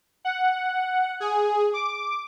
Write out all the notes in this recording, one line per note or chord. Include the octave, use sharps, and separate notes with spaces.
F#5
G#4
D6